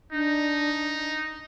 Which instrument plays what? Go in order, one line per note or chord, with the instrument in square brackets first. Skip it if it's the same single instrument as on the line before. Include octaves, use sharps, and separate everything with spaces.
[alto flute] D4 [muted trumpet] D#4